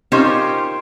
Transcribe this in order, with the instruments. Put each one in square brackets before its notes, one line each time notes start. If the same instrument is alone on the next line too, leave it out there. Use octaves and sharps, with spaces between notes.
[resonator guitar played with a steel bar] C#4 D#4 F4 G4 A#4 C5